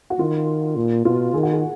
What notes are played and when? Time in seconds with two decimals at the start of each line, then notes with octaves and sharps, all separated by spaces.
0.10 F#4
0.19 D#3 F4
0.76 A#2
1.05 B2 F4
1.34 D#3 G#4
1.43 F#4
1.53 G#4